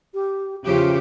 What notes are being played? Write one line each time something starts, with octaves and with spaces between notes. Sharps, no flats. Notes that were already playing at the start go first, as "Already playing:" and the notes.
G4
E2 C#3 F3 G4